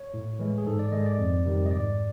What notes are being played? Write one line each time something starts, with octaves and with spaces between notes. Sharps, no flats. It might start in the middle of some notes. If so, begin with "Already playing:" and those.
Already playing: C#5
A2
E3 G#3
G#4
G#2 A4
D5
D#3 G#3 D#5
D5
F2
C3 D#3 G3
D#5
G#2 D5